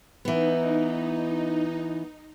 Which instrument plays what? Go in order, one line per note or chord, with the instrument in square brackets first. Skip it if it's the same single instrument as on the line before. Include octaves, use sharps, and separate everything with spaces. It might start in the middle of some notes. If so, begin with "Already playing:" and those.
[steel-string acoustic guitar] E3 B3 [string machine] D#4